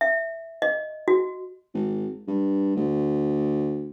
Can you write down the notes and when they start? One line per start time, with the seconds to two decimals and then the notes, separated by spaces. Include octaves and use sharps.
0.01 E5
0.62 D#5
1.08 F#4
1.74 G#1
2.27 G2
2.76 D2